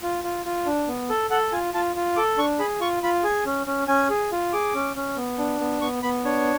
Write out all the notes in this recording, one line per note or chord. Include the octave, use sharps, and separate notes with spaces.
F4
F4
F4
D4
B3
A4
A4 F#5
F4 G#5
F4 A5
F4
A4 D6
D4 C#6
G#4 B5
F4 C#6
F4 B5
G#4 G#5
C#4
C#4
C#4 G#5
G#4
F4
G#4 D6
C#4
C#4
B3
D4
B3
B3 C#6
B3 B5
D4 C#5